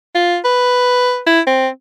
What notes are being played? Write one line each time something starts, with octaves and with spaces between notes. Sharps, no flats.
F4
B4
E4
C4